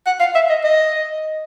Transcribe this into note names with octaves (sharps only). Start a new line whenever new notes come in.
F#5
F5
E5
D#5
D#5